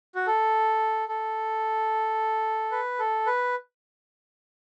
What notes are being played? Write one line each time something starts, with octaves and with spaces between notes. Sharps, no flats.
F#4
A4
A4
B4
A4
B4